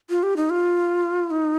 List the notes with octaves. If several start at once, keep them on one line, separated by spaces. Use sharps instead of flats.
F4
G4
D#4
F4
D#4